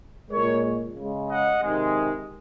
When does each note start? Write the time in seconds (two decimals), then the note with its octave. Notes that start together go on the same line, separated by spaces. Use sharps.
0.31 A#2 G#3 A#4 C#5
0.96 C#3 G#3
1.28 D#5 F#5
1.61 C3 D#3 G#3